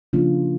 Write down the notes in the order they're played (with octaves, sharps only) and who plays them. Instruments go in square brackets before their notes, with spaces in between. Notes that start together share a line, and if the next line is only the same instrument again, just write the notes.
[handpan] C#3 F3 A#3 D4 F4